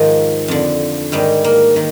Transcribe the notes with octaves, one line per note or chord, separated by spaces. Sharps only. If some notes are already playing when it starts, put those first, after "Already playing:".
Already playing: G#2 D#3 F3
F2 D3
G#2 D#3 G3
A#3
D#3